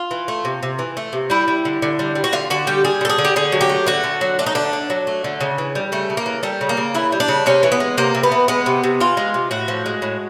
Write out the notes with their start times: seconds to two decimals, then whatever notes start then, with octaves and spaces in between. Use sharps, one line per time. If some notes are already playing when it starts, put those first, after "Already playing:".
Already playing: F4
0.11 E3
0.28 A3
0.45 C3
0.63 C3
0.79 E3
0.97 A3
1.13 C3
1.30 G3 E4
1.48 G3
1.65 D3
1.82 D3
1.99 G3
2.15 G3
2.24 F#4
2.32 D3 F4
2.50 D3 F#4
2.67 G3 G4
2.84 G3 G#4
3.01 D3 A4
3.09 G#4
3.18 D3
3.25 G4
3.36 D3 G#4
3.52 F#3
3.61 G4
3.69 A3
3.86 D3 F#4
4.04 D3
4.21 F#3
4.39 A3 D4
4.46 D#4
4.55 D3 D4
4.73 D3
4.90 F#3
5.07 A3
5.24 D3
5.41 C#3
5.58 E3
5.75 G3
5.92 C#3 A3
6.10 C#3
6.17 A#3
6.26 E3
6.43 G3 A3
6.61 C#3
6.69 A#3
6.77 C#3
6.94 E3 E4
7.12 G3
7.20 D4
7.28 C#3
7.46 C3 C#4
7.63 E3
7.72 B3
7.80 G#3
7.97 C3 A#3
8.15 C3
8.23 B3
8.32 E3
8.48 G#3 B3
8.66 C3
8.84 C3
9.00 E3 F4
9.17 G#3
9.34 C3
9.51 A2 F#4
9.68 F3
9.86 G#3
10.02 A2